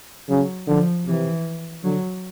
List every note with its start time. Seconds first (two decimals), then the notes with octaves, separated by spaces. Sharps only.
0.29 C#3 F#3
0.67 D3 F3
1.06 C3 E3
1.84 D3 F#3